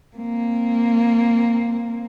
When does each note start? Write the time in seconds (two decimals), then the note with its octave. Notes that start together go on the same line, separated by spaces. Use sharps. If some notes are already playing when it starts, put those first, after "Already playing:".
0.17 A#3 C4